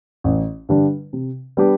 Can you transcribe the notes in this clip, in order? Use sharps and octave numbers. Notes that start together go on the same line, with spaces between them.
A1
G2 D3 G3 D4
C3
G3 B3 D4 G4